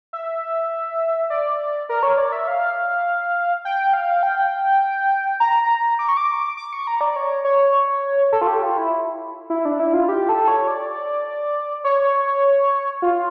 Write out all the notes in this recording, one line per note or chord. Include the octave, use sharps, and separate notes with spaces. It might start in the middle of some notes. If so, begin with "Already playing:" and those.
E5
D5
A#4
C#5
D5
E5
F5
G5
F5
G5
A#5
D6
C#6
D6
D6
C#6
A#5
D5
C#5
C#5
A4
F4
G4
F4
E4
E4
D4
E4
F4
G4
A4
C#5
D5
C#5
F4